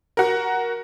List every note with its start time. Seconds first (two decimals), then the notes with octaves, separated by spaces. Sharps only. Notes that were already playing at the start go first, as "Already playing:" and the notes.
0.17 F#4 A#4